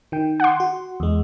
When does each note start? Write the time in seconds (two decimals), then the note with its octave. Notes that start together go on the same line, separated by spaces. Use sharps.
0.12 D#3 G5
0.40 F#5 C6
0.60 F#4
1.00 E2 G#3